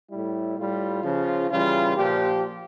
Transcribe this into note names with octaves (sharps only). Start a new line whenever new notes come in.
A2 G3 E4
A2 G3 F4
C#3 F3
C#3 E3 G3 F4
A#2 F3 G4